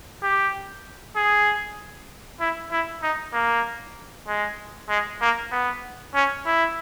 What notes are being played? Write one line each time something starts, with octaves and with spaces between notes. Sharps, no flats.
G4
G#4
E4
E4
D#4
A#3
G#3
G#3
A#3
B3
C#4
E4